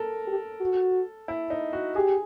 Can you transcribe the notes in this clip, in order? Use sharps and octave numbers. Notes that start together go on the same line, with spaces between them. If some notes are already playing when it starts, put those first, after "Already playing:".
Already playing: A4 A#4
G4
F#4
E4
D#4
F#4
G4 G#4